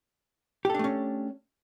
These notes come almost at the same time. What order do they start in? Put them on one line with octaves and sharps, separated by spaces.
G4 A4 D4 A3 C#4